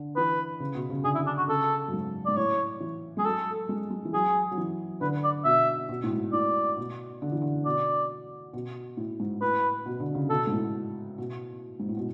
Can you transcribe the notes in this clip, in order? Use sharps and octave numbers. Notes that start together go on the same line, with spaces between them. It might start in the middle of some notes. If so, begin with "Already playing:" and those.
Already playing: D3
E3 B4
C#3
B2
C#3
D3 G#4
E4
D4
F#4
C#3 A4
F#2
G#2
G#2 D5
A2 C#5
E3
G#3 G#4
F#3 A4
G#3
G#3
E3
F#3 G#4
F#3
E3
D3 B4
D5
B2 E5
B2
A2
G#2
A2 D5
B2
D3
E3
D3
B2 D5
B2
A2
G#2
A2 B4
B2
D3
C#3
B2 A4
G#2
A2
B2
G#2
A2
B2